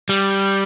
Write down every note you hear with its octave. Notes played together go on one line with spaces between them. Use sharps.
G3